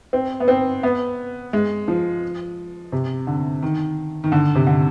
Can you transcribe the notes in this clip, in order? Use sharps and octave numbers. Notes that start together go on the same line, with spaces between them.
C4
B3
C4
B3
G#3
F3
C3
D3
D#3
D#3
D3
C3
D3